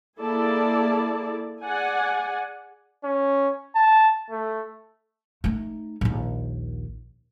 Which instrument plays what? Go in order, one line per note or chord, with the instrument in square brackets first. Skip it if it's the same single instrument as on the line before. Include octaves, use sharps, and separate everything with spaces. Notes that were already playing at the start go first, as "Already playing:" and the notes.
[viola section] A#3 E4 G#4 A4 D5 A5
G#4 D5 F#5 G#5
[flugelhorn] C#4
A5
A3
[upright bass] A3 D#4
A#1 D#2